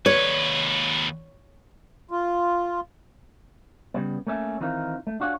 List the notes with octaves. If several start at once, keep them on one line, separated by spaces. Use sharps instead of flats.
D#2 B4 C#5
F4
C#3 G3 B3
A3 A#3 C#4 E5
D#3 E3 C4 D#4 F4 A#4
A3
D4 F4 F#4 G#4 C#5